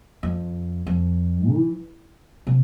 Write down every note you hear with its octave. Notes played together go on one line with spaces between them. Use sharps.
F2
F2
E3
C3